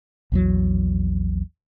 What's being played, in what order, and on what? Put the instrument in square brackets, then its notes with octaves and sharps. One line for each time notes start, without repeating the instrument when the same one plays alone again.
[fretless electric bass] A#1 E2 F#3